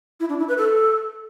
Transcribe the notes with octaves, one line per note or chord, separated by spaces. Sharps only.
E4
D4
E4
B4
A4